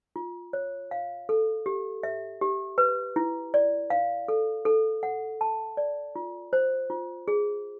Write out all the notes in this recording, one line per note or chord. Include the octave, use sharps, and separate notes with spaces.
F4
C#5
F5
A4
G4
E5
G4
B4
E4
D5
F5
A4
A4
F#5
A5
D5
F4
C5
F4
G#4